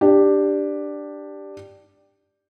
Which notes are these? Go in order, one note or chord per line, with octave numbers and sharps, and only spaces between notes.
D4 G4